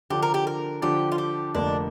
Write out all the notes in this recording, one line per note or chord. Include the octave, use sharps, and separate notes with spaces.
D3 F3 D4 G4
A#4
G4
A#4
D3 F3 D4 G4
F4
G4
F1 F2 D3 A#3 D4